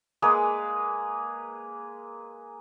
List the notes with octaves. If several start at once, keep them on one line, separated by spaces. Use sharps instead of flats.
G#3 A#3 G#4 B4